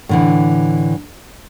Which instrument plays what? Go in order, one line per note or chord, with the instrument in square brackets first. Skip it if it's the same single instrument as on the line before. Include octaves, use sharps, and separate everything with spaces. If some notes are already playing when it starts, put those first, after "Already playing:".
[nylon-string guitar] A2 D3 E3